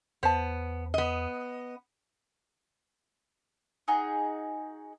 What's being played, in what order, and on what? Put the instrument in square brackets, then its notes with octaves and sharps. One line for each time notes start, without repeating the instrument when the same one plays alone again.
[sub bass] E2 [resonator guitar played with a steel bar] B3 [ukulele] C5 A5
[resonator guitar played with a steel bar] B3 D#5
[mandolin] D#4 F#4 G#4